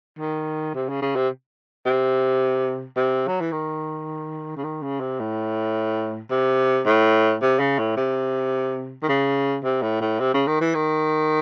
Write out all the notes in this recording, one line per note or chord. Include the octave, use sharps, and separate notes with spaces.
D#3
C3
C#3
C#3
C3
C3
C3
F#3
E3
D#3
C#3
D#3
C#3
C3
A2
C3
A2
C3
C#3
A2
C3
D#3
C#3
C3
A2
A2
C3
C#3
D#3
E3
D#3